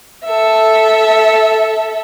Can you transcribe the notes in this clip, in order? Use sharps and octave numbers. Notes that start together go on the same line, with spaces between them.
A4 E5